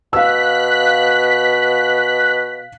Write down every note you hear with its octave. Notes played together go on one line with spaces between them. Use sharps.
B2 F5 E6 F#6 B6